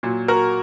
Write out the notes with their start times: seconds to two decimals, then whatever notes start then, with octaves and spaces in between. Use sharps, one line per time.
0.03 A#2 F#3
0.28 F#4 A#4